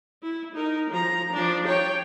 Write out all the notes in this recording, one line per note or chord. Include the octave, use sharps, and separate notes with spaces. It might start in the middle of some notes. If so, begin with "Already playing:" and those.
E4
D#4 A#4
F3 A#5
F3 D4
C#5 G5